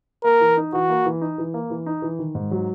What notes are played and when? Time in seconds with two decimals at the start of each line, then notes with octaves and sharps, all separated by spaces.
0.24 A#3 A#4
0.40 E3
0.57 D#4
0.73 E3 F#4
0.89 A#3
1.06 E3
1.21 D#4
1.38 E3
1.54 A#3
1.70 E3
1.86 D#4
2.02 E3
2.19 D#3
2.35 G#2
2.51 F#3